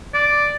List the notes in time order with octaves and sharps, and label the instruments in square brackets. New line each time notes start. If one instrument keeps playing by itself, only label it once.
[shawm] D5